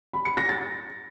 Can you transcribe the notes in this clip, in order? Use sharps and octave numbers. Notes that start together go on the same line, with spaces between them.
B5
C#7
A#6
A6